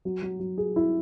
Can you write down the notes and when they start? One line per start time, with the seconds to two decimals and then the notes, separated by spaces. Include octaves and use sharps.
0.05 F#3
0.22 F#3
0.40 F#3
0.58 G#4
0.76 E4